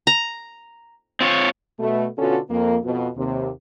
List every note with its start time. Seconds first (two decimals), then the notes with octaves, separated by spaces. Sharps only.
0.07 A#5
1.21 C4 F4 C#5
1.79 B2 A3
2.18 B2 D3 C#4 F4 F#4 A4
2.50 F2 A#3
2.84 F2 B2
3.17 D#2 C3